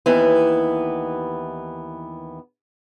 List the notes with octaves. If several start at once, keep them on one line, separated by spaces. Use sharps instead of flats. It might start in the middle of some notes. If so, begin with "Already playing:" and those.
D#2 E3 B3